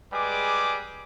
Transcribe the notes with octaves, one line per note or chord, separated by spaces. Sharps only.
G3 G#3 G#4 B4 D6